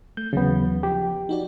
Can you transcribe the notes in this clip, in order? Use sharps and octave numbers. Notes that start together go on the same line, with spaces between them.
A3 G6
D#2 C#3 E3 F#3 B3
F3 G4
D#4 F#4 D5